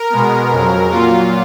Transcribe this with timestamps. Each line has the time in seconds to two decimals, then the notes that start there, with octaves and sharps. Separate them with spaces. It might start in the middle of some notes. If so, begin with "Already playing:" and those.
Already playing: A#4
0.10 B2 G#3 B3
0.51 F2 C#3 F#3
0.91 A#2 F#3 A#3 F4